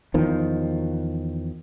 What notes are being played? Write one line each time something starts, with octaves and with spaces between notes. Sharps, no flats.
E2 D#3 F3